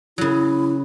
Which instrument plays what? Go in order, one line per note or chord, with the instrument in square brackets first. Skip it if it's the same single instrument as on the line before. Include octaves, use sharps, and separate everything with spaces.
[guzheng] C#3 F#3 [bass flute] E4